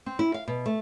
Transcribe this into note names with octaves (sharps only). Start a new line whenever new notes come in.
C4
E4
F5
B2
A3